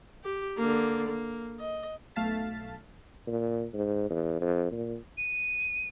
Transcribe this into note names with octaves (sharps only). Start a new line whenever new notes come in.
G4
D3 A#3
A#3
D#5
B1 A3 F5 A5 A6 B6
A#2
G#2
E2
F2
A#2
D#7